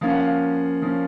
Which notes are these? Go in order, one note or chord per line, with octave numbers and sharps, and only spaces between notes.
F3 A#3 C#4 F5
F#5
F5
F3 A#3 C#4